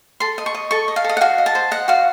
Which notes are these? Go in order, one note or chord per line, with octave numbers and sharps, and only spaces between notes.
A4 C6
D#5
C#6
D#5
A4 C#6
D#5
F5
A4 D#5
F#5
F#4 F5
D#5
A5
C5
D#5 F#5
F#4 F5